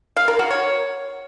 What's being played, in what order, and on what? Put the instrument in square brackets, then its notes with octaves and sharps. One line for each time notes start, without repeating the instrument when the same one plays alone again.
[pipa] F5
A#4
F#4
C#5